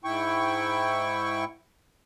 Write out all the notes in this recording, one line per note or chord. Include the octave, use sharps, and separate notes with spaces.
G#2 E4 G5 C#6